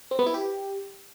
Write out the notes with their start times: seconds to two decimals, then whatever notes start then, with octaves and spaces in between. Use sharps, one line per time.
0.11 C4
0.19 B3
0.26 E4
0.34 G4